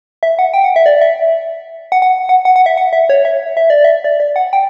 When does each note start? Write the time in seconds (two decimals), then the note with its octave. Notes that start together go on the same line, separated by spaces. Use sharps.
0.23 E5
0.39 F#5
0.54 G5
0.64 F#5
0.76 E5
0.86 D5
1.01 E5
1.92 F#5
2.02 F#5
2.29 F#5
2.45 F#5
2.56 F#5
2.66 E5
2.77 F#5
2.93 E5
3.09 C#5
3.25 E5
3.57 E5
3.70 D5
3.84 E5
4.04 D5
4.20 D5
4.36 F#5
4.53 G5